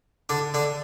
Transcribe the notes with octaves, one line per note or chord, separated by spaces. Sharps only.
D3 D4
D3 D4